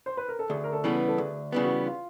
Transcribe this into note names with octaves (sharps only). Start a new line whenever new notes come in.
C5
B4
A#4
A4
D2 G#4
A#4
A4
C#3 E3 G3 B3
A4
D2 G#4
C#3 E3 G3 B3
F#4
F4